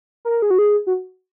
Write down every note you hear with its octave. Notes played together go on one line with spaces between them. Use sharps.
A#4
G#4
F#4
G#4
F#4